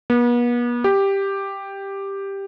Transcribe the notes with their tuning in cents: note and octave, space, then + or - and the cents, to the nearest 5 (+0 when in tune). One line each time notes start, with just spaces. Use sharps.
B3 -40
G4 +5